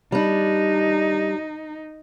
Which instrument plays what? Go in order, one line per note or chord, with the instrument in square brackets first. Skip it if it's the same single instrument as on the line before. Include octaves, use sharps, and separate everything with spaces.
[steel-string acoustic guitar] G3 D4 [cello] D#4